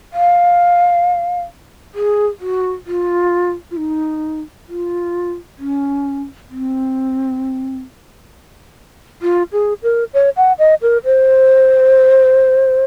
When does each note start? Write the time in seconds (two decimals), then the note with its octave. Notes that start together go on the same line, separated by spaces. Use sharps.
0.13 F5
1.95 G#4
2.40 F#4
2.86 F4
3.71 F4
3.77 D#4
4.68 F4
5.59 C#4
6.49 C4
9.22 F4
9.52 G#4
9.83 A#4
10.14 C#5
10.37 F#5
10.59 D#5
10.82 A#4
11.05 C5